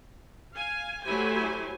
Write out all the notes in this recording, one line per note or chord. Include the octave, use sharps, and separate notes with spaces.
F5 G#5
F#3 A3 E4 G4 C5 G#5